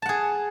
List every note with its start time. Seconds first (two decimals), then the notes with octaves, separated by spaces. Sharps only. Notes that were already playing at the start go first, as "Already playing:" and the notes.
0.02 A5
0.06 F#5
0.09 G#4